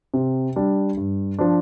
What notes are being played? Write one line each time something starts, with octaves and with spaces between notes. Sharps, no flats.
C3
G3 D4
G2
F3 D4